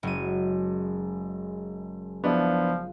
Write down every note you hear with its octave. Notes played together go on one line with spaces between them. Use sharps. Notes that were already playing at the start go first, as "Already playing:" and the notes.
F#1 F#2 G#3 D#5 D#7
F3 B3 D4 E4 F4